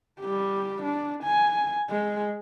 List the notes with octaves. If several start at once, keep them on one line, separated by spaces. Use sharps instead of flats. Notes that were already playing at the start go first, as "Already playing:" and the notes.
G3 G4
D4
G#5
G#3